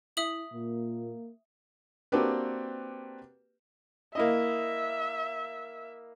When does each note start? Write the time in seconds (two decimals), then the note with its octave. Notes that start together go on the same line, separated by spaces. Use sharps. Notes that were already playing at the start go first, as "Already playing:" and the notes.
0.17 E4 E5 D#6 F#7
0.53 A#2 A#3
2.12 A#3 C4 D4 F#4 G4 B4
4.15 A#3 E4 D#5 E5